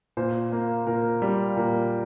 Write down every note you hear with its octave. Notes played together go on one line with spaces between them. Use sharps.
A#2 C5
A#3
A#2 A#4
G3
A#2 A#4